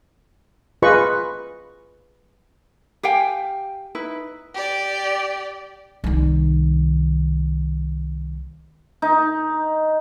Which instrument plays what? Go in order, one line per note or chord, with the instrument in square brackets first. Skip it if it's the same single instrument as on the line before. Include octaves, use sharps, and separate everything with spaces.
[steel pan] F4 G#4 B4 D#5 B5 C#6
[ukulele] G4 F5 G5 G#5
D#4 E4 B4
[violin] G4 D5
[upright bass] C2 D#3
[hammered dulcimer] D#4